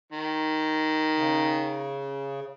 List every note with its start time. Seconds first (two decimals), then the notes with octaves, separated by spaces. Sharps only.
0.12 D#3
1.17 C#3